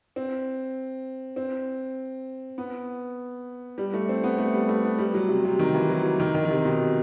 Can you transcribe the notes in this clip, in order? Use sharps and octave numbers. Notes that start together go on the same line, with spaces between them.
C4
C4
B3
G3
A3
C4
B3
A3
G3
A3
B3
G3
F#3
C3
C3
D#3
E3
F#3
E3
D#3
D#3
D#3
C3
B2